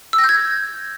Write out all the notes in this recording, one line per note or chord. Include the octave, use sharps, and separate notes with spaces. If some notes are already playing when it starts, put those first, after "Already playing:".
E6
A#6
G6
G#6